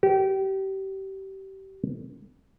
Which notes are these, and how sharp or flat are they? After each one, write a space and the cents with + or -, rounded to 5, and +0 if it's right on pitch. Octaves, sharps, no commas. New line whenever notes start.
G4 -30